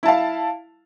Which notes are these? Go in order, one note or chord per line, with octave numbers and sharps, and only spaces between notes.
E4 F5 A5